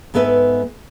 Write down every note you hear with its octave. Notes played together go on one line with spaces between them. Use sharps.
G#2 B3 A4 B4 E5